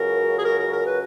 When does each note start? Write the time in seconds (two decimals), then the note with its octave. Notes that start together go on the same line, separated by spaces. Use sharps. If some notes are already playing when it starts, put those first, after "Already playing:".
Already playing: C#2 C#3 F#3 A#4
0.37 G#4
0.42 A#4
0.57 A#4
0.70 A#4
0.84 B4